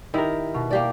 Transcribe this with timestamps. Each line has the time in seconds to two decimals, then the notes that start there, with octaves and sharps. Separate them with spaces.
0.14 D#3 E4 G4 A#4
0.54 B2
0.71 A#3 G4 D5